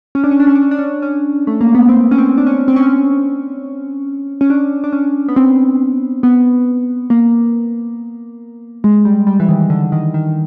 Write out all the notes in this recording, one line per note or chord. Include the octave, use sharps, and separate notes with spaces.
C#4
D4
C#4
D4
C#4
D4
C#4
D4
C#4
C#4
A3
A#3
B3
C4
C#4
C4
D4
C#4
C4
C#4
C#4
D4
D4
C#4
B3
C4
B3
A#3
G#3
G3
G3
E3
D#3
D3
D#3
D#3